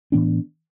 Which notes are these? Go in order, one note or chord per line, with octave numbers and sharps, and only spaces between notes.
A2 E3 B3 D4